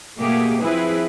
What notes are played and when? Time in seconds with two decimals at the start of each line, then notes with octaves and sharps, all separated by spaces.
0.19 B2 A3 A#3 G4 G#4
0.61 F3 C4 E4 G#4 B4